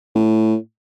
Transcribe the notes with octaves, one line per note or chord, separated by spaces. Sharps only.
A2